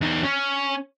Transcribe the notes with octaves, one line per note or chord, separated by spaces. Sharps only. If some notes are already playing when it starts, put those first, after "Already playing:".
E2 D#4
C#4